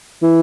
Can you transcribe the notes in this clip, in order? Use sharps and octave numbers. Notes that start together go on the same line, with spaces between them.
E3